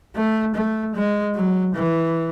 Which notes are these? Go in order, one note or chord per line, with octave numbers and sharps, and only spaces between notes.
A3
A3
G#3
F#3
E3